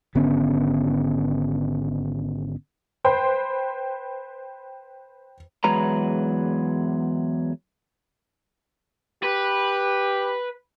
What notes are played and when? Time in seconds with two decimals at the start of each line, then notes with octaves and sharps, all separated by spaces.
0.15 G#1 D3 B3 C#4
3.04 B4 C5 G5 C6
5.64 E2 F#3 G#3 B4 A#5
9.23 G4 B4